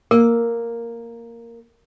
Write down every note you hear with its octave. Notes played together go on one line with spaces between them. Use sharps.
A#3 A#4